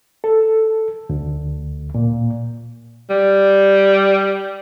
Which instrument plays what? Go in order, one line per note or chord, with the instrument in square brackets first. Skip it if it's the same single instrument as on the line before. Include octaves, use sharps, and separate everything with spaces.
[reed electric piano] A4
D2
A#2
[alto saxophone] G3